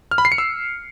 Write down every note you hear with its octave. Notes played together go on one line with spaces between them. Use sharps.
F6
B5
C7
C#7
E6